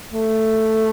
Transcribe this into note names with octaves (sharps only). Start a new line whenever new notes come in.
A3